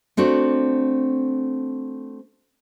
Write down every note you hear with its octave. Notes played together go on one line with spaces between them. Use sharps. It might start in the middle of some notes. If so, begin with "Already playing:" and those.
A3 C4 D4 F#4